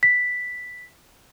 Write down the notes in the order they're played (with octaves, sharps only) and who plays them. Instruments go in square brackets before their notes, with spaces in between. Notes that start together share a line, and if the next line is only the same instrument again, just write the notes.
[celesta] B6